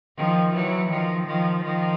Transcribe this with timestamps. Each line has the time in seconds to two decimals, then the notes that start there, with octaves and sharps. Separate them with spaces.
0.17 D#3 F3
0.54 E3 F#3
0.90 D#3 F3
1.27 D#3 F3
1.63 D#3 F3